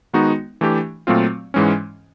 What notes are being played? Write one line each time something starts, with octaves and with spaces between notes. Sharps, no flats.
D#3 G#3 B3 D#4 F#4
E3 A3 D4 G4
A#2 F#3 A3 C4 F4
G#2 E3 G#3 C#4